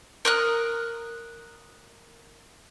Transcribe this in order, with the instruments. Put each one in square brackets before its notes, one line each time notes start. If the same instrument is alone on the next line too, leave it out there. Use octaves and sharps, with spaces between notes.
[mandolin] A#4 D#6 F#6